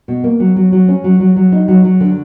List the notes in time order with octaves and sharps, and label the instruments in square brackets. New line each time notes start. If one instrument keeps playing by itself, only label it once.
[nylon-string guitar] B2
A#3
F#3
F#3
F#3
C#4
F#3
F#3
F#3
D#4
F#3
F#3
D3